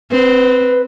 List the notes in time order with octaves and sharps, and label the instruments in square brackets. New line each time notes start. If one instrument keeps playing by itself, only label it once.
[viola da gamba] C4 [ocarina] B4